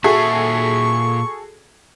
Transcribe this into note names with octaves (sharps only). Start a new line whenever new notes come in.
A#2 F#4 G#4 A4 E5 C#6